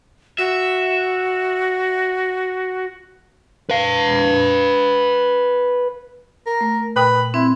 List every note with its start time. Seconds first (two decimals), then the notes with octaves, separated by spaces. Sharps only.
0.38 F#4 E5
3.70 B4 F5
6.46 A#4
6.61 A3
6.96 A#2 B4 G5 D#6
7.34 C4 E4